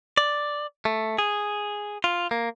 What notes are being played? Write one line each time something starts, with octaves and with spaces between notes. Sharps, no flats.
D5
A3
G#4
F4
A#3